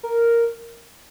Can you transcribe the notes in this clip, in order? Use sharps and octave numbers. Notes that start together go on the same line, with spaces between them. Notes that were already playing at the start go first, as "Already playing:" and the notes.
A#4